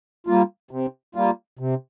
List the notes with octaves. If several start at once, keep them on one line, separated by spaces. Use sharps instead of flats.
G3 A#3 F4
C3
G3 A#3 F4
C3